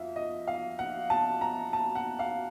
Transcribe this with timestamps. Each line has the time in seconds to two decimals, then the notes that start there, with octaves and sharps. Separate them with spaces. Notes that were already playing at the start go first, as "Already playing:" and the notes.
Already playing: F2 E5 F5
0.16 D#5
0.47 F5
0.79 F#5
1.10 A5
1.41 A#5
1.73 A5
1.95 F#5
2.19 F5